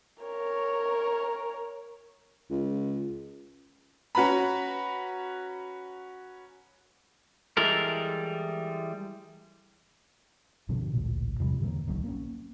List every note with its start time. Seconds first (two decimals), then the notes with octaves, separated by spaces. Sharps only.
0.23 A#4 C#5
2.50 C#2
4.15 C#4 F#4 B4 A#5 B5
7.57 E3 G3 G#3 A4 A#4
10.69 G2 B2 D3 F3
10.93 A1 D2 A#2
11.40 E2 C3 F3 G3
11.60 G#2 D3 E3 A#3
11.87 D1 B1 D#3 F#3
12.04 A#3 B3 C#4